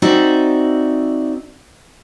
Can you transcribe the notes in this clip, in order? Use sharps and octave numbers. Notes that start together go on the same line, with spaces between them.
C4 D#4 F#4 D5 E5